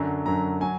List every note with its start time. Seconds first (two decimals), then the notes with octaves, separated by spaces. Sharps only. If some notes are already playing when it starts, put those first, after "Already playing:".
Already playing: F#2 D3 F#3 A#5
0.26 F#2 D3 F#3 A#5
0.61 F#3 G#5